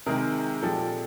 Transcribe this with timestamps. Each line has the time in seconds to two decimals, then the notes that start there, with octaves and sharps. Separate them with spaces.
0.06 C3 D#3 G#3 G#4 A#4
0.62 A#2 F3 G#3 G4 A4